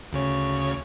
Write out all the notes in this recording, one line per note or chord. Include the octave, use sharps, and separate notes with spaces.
D2 C#3 C#5